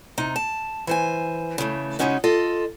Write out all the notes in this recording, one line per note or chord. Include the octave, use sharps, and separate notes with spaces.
C3 D#4
A5
E3 C5 G#5
C#3 E3 G#3 A3
C#3 E3 G#3 C#4 D#4 F#4
F4 A4 D#5